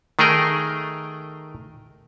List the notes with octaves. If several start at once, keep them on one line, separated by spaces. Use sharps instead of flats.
D#3 A3 G#4 A#4 G5